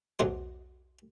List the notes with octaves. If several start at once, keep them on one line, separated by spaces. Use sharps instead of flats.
B1 E2 F#3 C5